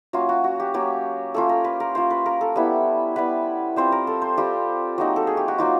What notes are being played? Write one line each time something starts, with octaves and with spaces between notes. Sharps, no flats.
F#3 A#3 C#4 F4
F#4
F#4
G4
F#3 A#3 C#4 G4
A#3 C#4 F4 A4
A#4
B4
A#4
A#3 C#4 F4 C5
B4
A#4
A4
G3 B3 E4
G3 B3 E4 B4
G3 C4 F4 C5
A#4
A4
C5
G3 C4 F4 G4
F#3 A#3 D#4
A4
G#4
G4
F#4
F#3 A#3 D#4 F4